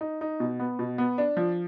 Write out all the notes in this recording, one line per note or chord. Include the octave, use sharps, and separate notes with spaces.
D#4
D#4
B2
B3
B2
B3
D4
F3